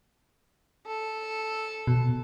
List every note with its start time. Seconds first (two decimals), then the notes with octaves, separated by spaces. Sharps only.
0.86 A4
1.87 B2